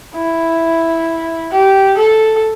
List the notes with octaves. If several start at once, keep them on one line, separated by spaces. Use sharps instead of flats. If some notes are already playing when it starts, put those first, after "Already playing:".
E4
G4
A4